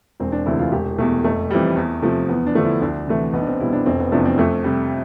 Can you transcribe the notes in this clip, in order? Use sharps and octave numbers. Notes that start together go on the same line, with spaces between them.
E1 C4
D4
D2 C3 E3 E4
F4
E1 G4
E2 B2 A3
F1 A3
F2 E3 G3
E2
C3 F3 A3
E2 B3
D4
D3 F3 A3
E4
D2 D4
C3 E3 A3
B1 B3
D4
C4
B2 G3 E4
D4
F1 C4
B3
E2 C3 F3 A3 D4
C4
F2 A3
C3 G3